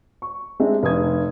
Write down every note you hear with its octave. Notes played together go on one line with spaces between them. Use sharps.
C#6
G#3 C4 D4 D#4 E5
F1 D4 D#6 G#6